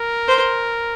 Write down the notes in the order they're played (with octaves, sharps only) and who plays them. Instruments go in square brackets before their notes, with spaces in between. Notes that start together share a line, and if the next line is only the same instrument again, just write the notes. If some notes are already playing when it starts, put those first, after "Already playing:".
Already playing: [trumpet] A#4
[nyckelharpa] C5